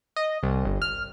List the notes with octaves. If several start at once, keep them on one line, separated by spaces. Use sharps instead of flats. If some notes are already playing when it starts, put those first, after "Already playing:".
D#5
C2
G1
F6